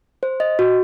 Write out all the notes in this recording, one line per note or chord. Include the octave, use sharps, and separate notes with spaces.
C5
D#5
F#4